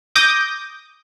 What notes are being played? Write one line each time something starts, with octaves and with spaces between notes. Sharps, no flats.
D6 D#6 G6 A#6